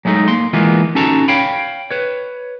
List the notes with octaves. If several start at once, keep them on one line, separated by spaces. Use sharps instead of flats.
F#3 G#3 A3 D4 D#4
A#3 C6
E3 G#3 A#3 B3 F4
C#4 D#4 F#4 A4 A5 A#5
C#5 F5 G5 B5
B4 C#5